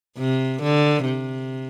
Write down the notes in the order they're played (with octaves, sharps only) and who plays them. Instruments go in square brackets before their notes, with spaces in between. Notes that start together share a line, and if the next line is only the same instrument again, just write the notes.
[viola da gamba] C3
D3
C3